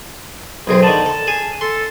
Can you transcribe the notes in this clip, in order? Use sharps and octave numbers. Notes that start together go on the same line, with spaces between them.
B1 F#2 C4 G#4
D3 D#3 A5
A4
G#4
A4 C6